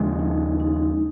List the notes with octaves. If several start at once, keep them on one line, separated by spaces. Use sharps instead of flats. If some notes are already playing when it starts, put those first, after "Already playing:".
Already playing: D#2 C#3 F3 G#3 D4
D#4
D#4